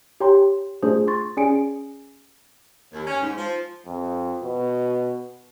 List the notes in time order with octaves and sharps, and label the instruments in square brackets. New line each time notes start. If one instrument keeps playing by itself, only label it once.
[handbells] G4 C#5 G5 A#5 C6
A3 D4 F4 G#4 C5
C6 C#6 A6
C#4 G#4 D5 G#5 C#7 D7
[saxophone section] D#2
C#4
G#2
F3
[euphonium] F2
B2